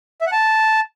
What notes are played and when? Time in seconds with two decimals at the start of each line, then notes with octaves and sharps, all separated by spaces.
0.21 E5
0.27 F#5
0.32 A5